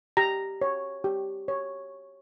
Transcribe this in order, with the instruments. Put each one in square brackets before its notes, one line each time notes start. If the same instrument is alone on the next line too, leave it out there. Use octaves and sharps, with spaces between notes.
[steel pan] G4 A#5
C#5
G4
C#5